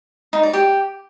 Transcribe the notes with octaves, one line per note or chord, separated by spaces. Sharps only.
D#4
D5
G4